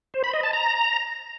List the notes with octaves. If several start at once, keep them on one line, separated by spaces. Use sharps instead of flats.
C5
B5
D#5
A5
A#5